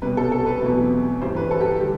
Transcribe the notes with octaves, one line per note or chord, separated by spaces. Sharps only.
C2 B2 G3 B4
A4
A4
B4
E2 B2 F#3 A3 C4
G2 E3 G3 C5
B4
A4
G4
D3 G3 G4